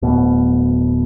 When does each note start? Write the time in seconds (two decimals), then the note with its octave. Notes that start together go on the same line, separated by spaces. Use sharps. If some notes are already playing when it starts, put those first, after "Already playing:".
0.02 D1 B2